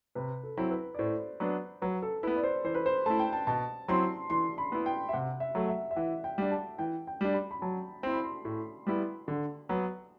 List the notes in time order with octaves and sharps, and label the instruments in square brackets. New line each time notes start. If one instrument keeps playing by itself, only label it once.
[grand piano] C3 [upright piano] B4
[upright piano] A4
[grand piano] F#3 C4 E4
[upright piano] B4
D5
[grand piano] A2 [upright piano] C5
[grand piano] F#3 B3 D4
[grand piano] F#3 [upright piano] B4
[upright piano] A4
[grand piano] E4 [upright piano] B4
[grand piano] B3
[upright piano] D5
C5
[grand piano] E3 [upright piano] C5
[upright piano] B4
C5
[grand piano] A3 E4 [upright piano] A5
[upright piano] G5
A5
[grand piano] B2 [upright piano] A5
[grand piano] F#3 C4 E4 [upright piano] C6
[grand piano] E3 [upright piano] C6
[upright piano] B5
[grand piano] B3 E4
[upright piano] G5
E5
[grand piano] C3 [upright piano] F#5
[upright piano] E5
[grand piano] F#3 A3
[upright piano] E5
E5
[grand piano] E3 [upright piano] F#5
[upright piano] G5
[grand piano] G3 D4
[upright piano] A5
[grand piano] E3 [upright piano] G5
[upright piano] G5
[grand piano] G3 D4
[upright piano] B5
B5
[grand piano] F#3 [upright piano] A5
[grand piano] C4 E4 [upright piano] C6
[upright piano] B5
C6
[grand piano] A2
G3 B3 E4
D3
F#3 B3